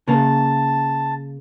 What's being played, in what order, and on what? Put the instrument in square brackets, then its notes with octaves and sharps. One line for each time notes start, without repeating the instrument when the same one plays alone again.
[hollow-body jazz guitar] C#3 A#3 [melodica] A5